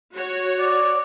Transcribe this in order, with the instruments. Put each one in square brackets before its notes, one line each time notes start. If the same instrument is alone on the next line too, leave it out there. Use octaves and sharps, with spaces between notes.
[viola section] F#4 C#5
[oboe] D5